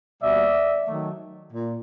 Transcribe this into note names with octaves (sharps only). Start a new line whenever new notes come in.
B2 G3 A#3 D5 E5
D#3 F#3 A3
A#2